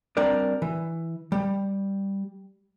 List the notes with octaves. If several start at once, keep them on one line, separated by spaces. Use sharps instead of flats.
G3 C4 D4 A#4 D5
E3
G3